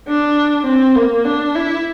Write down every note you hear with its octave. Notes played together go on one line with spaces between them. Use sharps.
D4
C4
A#3
D4
E4